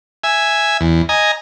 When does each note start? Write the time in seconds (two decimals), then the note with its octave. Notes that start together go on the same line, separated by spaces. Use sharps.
0.24 E5 G#5
0.81 E2
1.09 D#5 G#5 A#5